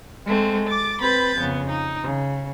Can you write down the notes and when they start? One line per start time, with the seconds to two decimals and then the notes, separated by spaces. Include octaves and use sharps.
0.25 G#3 A3 C4
0.68 D6 A6
1.00 C4 B4 B5 G6 A6
1.38 F2 C#3 B3
1.70 D#4
2.02 C#3